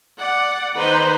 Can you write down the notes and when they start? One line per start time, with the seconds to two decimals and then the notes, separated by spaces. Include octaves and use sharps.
0.19 D5 F#5
0.75 D#3 D#4 B4 C5